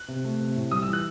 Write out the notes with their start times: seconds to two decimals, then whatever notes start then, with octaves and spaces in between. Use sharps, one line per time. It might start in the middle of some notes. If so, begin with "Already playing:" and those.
Already playing: F#6
0.08 C3
0.25 A3
0.40 C3
0.56 A2
0.71 G3 D#6
0.83 E6
0.88 E3 F#6